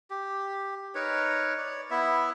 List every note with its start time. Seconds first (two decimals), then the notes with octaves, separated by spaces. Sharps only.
0.10 G4
0.95 D#4 A#4 B4 C#5
1.58 C#5 D5
1.91 B3 E4 E5